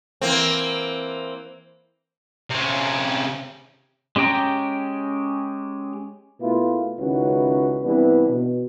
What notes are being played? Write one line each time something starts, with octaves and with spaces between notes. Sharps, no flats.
E3 A#3 C4
C3 C#4
G#3 C#4 G4 G5 A#5
B2 A3 A#3 E4 F4 B4
C#2 D#3 C#4 E4 F#4 B4
C3 E3 G3 B3 D4 B4
B2